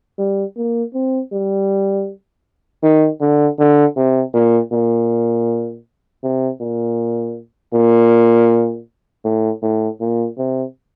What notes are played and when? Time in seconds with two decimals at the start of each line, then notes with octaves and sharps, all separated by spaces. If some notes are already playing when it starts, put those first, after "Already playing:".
0.18 G3
0.57 A#3
0.94 C4
1.32 G3
2.83 D#3
3.21 D3
3.59 D3
3.96 C3
4.34 A#2
4.72 A#2
6.23 C3
6.60 A#2
7.74 A#2
9.25 A2
9.62 A2
10.01 A#2
10.38 C3